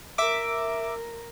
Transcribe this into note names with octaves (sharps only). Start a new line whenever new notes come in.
A#4 E5 D6